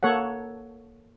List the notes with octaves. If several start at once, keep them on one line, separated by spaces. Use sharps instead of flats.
A#3 A4 C#5 F#5